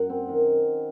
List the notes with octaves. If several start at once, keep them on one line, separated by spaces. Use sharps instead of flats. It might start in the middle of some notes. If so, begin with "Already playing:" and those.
Already playing: F#2 F#5
C4
D#3